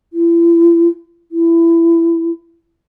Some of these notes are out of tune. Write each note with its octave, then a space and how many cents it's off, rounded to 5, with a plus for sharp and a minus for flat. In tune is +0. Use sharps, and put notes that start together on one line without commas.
E4 +40
E4 +20